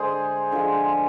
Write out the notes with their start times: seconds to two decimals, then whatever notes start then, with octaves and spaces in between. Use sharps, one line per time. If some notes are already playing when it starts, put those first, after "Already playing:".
Already playing: D3 G#3 G#4 C5
0.52 D3 F3 G#3